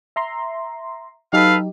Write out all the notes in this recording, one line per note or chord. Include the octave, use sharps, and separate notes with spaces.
E5 A#5 C6
F#3 D#4 G4 A4 B4 F5